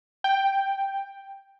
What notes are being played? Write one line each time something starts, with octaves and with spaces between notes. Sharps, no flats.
G5